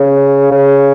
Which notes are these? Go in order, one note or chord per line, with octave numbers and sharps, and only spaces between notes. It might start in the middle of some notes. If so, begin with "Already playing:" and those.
Already playing: C#3
C#3